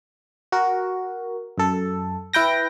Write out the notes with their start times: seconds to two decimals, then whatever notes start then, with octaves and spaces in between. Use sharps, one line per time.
0.52 F#4 A#4
1.58 F#2 A4
2.33 E4 B4 G5 A#6